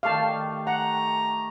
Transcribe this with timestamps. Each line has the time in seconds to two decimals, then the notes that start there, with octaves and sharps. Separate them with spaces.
0.03 D#3 A3 G4 F5 A5
0.67 F#5 A#5